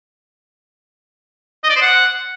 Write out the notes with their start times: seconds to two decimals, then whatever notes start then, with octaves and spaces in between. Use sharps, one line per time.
1.64 D#5
1.70 D5
1.76 C5
1.82 F#5